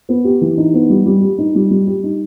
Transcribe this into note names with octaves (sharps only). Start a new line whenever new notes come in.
B3
G4
E3
D#4
B3
G3
G3
G4
D#4
G3
G3
G4
D#4